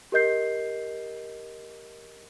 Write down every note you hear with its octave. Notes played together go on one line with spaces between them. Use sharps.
G4 A#4 D#5 G6 C7